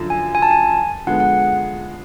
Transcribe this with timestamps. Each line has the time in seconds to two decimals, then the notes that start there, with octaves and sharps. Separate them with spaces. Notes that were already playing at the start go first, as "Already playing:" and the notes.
Already playing: F#2 D3 F3
0.10 G#5
0.35 G#5
0.42 A5
0.51 G#5
1.07 D3 F3 G#3 B3 F#5
1.20 F#5